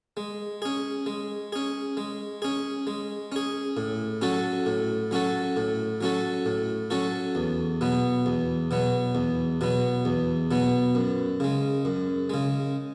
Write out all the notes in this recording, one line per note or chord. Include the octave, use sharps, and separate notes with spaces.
G#3
C#4 G#4
G#3
C#4 G#4
G#3
C#4 G#4
G#3
C#4 G#4
A2
F#3 C#4 F#4 A4
A2
F#3 C#4 F#4 A4
A2
F#3 C#4 F#4 A4
A2
F#3 C#4 F#4 A4
E2
B2 F#3 B3
E2
B2 F#3 B3
E2
B2 F#3 B3
E2
B2 F#3 B3
F#2
C#3 G#3
F#2
C#3 G#3